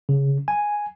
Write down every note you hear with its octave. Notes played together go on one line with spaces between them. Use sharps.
C#3
G#5